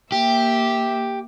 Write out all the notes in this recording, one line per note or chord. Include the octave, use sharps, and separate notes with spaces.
A#3 G4 E5